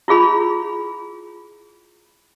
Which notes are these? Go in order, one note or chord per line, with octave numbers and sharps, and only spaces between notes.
E4 F4 G#4 B5